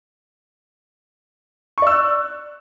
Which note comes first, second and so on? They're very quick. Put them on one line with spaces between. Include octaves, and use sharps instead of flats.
C#6 D5 E6 F#6